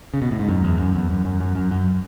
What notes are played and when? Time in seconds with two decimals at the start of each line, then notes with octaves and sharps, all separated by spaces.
0.14 C#3
0.22 B2
0.31 A2
0.39 G#2
0.49 F#2
0.64 E2
0.80 F#2
0.95 E2
1.10 F#2
1.25 F#2
1.41 F#2
1.55 F#2
1.71 F#2